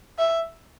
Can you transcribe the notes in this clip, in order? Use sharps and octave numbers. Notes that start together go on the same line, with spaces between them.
E5